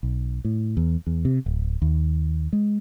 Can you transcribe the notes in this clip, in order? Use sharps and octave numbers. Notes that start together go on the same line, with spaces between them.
B1
A2
E2
E2
C3
D1
D#2
G#3